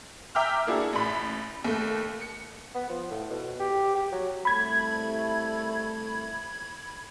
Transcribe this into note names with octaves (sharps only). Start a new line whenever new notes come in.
E5 G5 A#5 D6 F6
A#3 D4 E4 F#4 G#4
A1 B5
D#2 A3
C#7
B3
F3
A2
B2
G4
G4
F#3
C2 A3 B5 G#6